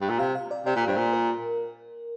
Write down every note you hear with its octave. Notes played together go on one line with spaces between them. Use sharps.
G2
A#2
C3 F5
F5
D5
C3 D5
A#2
G2 C5
A#2
A#4